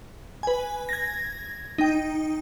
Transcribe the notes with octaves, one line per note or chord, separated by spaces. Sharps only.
B4 G#5
G#6 A#6
D#4 G5